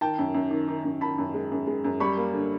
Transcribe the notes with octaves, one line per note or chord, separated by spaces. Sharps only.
D#3 G5 A5
F#2
F#2
D#3
D#3
F#2
D#3 A5 B5
F#2
G#3
F#2
G#3
F#2
G3 B5 C#6
A#3
D3